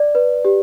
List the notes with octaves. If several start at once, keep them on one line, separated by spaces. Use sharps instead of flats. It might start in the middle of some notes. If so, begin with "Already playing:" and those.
Already playing: D5
B4
G4